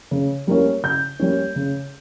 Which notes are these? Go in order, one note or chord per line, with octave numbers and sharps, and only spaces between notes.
C#3
G3 A#3 C#4
C#3 G6
G3 A#3 C#4
C#3